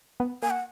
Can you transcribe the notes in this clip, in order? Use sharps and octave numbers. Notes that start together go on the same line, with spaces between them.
B3
A#3 G#5
F#5